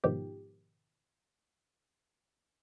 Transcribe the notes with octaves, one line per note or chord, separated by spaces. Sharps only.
G#2 B2 D#3 F3 G4